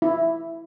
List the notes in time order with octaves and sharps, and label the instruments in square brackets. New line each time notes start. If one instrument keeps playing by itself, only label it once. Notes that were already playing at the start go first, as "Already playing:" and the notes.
[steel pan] E4